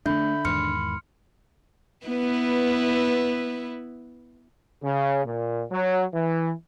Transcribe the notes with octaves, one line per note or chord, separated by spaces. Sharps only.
D3 A3 D4 E5 B5 G6
E2 G#2 D#3 C6 F6 C#7
B3 E4 B4
C#3
A#2
F#3
E3